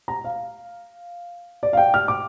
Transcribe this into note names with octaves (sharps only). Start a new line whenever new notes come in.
A#5
F5
D5
F5
G5
F6
D6